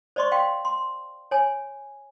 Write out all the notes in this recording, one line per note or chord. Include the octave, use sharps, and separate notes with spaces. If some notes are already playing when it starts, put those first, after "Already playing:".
C5 D5 D#5 C6 C#6
F5 G5 C6
C6
C#5 G#5